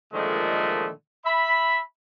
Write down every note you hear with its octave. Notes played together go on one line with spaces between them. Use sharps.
A#2 D3 D#3 F3 G#3 A3
E5 B5